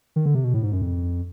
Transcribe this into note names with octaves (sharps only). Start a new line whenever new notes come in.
D#3
D3
C3
B2
A2
G#2
F#2
F2